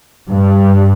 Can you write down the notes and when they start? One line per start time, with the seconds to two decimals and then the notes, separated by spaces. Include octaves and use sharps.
0.30 G2